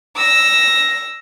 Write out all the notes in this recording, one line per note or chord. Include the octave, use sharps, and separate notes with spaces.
E6 A#6